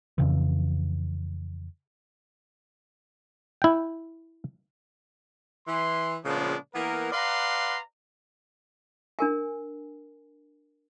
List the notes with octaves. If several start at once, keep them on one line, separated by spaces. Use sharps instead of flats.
F2 C#3 E3
E4 G5
E3 C6
A#2 C#3 F3 G#3 B3 D4
E3 A#3 B3 A#4
B4 D5 F5 F#5 A#5 C6
D4 A#4 G#5